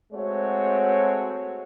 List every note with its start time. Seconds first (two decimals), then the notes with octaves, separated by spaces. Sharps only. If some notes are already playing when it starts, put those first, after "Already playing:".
0.13 G#3 A3 C4 F#4 C#5